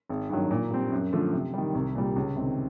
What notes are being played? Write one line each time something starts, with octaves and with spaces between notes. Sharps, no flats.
G#1
G2 D#3 F#3
A#2
G3 C4
F#2
D3 F3 A3
C3
D#3 G3
C2
A#2 G3
C#2
C3 D#3 G3 C4